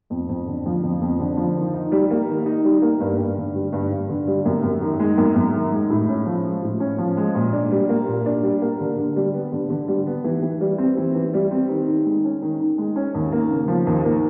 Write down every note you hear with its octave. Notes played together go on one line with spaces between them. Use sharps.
F2
F2
D3
F3
F2
F2
D3
F3
D#3
D#4
G3
A#3
D#3
D#4
G3
A#3
G2
G2
D3
G3
G2
G2
D3
G3
F#2
F#2
D#3
G#3
F#2
F#2
D#3
G#3
A2
C#4
F3
G#3
A2
C#4
F3
G#3
A#2
D4
G3
A#3
A#2
D4
G3
A#3
D3
D3
G3
B3
D3
D3
G3
B3
E3
E3
G3
C4
E3
E3
G3
C4
D#3
D#3
G#3
C#4
D#3
D#3
G#3
C#4
D#2
A#3
C#3
F3
D#2
A#3